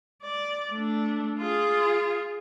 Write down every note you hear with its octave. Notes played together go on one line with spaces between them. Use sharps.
D5
A3 D4
F4 G#4